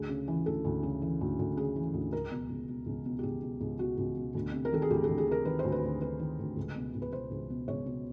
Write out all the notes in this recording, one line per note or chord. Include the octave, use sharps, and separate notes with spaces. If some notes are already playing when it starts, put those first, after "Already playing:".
Already playing: D2 G#4
C#3
E3
D2 A4
D2
C#3
E3
D2
D2
C#3 G#4
E3
D2
C#2 A#4
B2
C#2
B2
C#2
B2
G4
C#2 G#4
B2
C#2
B2 F#4
C#2
B2
D2
C3
A#4
D#3 A4
G#4
D2 G4
A4
D2
G#4
C3 A#4
D#3 B4
C5
D2
B4
D2
C3 B4
D#3
D2
C#2
B2
C#2
B4
B2 C5
C#2
B2
C#2 C#5
B2